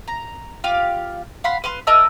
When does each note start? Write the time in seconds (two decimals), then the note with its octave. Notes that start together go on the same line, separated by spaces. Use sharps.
0.08 A#5
0.64 F4 G4 F5
1.44 F5 F#5 B5 C6
1.64 B4 F5 C6
1.87 A#4 D#5 A5 E6